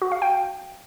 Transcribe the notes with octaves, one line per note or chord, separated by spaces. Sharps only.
F#4
F5
G5